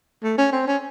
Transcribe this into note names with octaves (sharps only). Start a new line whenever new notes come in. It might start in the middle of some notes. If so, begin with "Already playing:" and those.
A3
C#4
C4
C#4